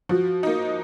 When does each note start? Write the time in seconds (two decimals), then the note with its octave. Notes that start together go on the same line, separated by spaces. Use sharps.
0.09 F3 F#4
0.43 A#3 D#4